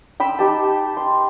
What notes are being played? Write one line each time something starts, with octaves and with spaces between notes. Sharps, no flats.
G5 B5 E6
D#4 G4 A5
C6